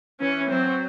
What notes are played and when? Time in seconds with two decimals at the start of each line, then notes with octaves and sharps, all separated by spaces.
0.20 E3 C#4
0.50 F#3 C4